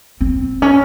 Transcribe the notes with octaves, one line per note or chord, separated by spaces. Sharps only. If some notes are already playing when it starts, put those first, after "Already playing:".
C4
C#4